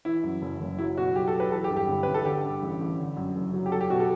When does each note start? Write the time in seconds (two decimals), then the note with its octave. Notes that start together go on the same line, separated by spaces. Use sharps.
0.05 E3 E4
0.24 F#2
0.42 F#1
0.61 F#1
0.78 F#3 E4
0.97 B2 F#4
1.16 B1 G4
1.27 A4
1.34 B1
1.40 B4
1.52 E3 A4
1.64 G4
1.70 G2
1.77 G4
1.88 G1
2.03 G1 B4
2.14 A4
2.25 D3 G4
2.44 G2
2.62 A1
2.81 A1
2.98 D3
3.17 F#2
3.36 F#1
3.54 F#3
3.66 G4
3.72 F#3 A4
3.81 G4
3.90 B2 F#4
4.00 A4